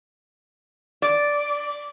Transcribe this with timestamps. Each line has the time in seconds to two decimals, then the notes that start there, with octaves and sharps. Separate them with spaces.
1.02 D5